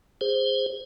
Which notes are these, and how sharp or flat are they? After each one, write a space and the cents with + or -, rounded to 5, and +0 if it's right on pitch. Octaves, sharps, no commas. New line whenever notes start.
G#4 -20 C5 +0